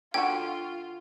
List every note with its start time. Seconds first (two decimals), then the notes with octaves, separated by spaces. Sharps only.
0.14 D3 D4 F4 F#4 G5